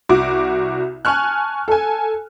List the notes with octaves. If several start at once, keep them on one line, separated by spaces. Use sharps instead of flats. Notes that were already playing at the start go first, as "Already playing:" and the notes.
C2 F#4 D6
G#5 A5 C#6 F6 F#6
A4 G#5